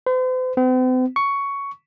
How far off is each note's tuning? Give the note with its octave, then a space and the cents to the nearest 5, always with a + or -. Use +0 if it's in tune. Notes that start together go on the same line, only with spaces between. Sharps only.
C5 -45
C4 -45
C#6 +10